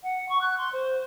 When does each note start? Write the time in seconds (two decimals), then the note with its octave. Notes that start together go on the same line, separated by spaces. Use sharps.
0.03 F#5
0.29 C#6
0.41 F#6
0.58 C6
0.73 C5